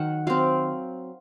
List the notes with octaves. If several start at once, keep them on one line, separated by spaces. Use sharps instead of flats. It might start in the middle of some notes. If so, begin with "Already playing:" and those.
Already playing: D#3 F#3 F#5
F#3 C4 F5